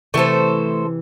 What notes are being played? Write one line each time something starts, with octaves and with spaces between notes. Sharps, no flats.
C3 E3 A3 E4 A4 C5